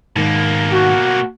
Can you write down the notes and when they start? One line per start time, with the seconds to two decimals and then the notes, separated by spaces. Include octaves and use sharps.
0.16 G#2 B2 D#3 A#3
0.72 F#4